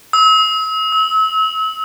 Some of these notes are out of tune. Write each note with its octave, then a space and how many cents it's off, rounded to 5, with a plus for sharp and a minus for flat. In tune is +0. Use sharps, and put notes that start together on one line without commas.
E6 -40
E6 -35